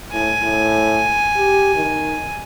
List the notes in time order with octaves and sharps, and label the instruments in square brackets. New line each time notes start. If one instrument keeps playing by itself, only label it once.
[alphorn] A2 [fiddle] G#5
[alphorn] A2
G4
D#3